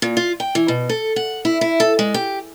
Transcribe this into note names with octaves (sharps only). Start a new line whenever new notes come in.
A#2
F4
G5
E3
B2
A4
F#5
E4
E4
A4
G#3
G4